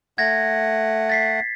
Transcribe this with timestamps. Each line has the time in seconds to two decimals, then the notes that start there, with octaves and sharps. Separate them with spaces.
0.18 A3 F#5 G#6 A#6
1.10 A6 B6 C7